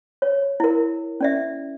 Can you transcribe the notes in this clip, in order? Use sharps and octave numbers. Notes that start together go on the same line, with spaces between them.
C#5
E4 A#4
C#4 D5 E5